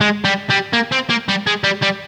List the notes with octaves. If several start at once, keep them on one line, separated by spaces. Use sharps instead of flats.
G#3
G3
G3
A#3
C4
A#3
G3
G#3
G3
G3